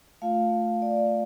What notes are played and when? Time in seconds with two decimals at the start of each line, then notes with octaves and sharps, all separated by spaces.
0.22 A3 F4 F5
0.82 D5